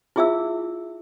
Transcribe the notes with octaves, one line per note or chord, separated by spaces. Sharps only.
E4 F4 G#4 E5 F5 E6